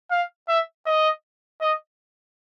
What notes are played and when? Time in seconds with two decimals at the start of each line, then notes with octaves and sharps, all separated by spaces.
0.11 F5
0.48 E5
0.86 D#5
1.61 D#5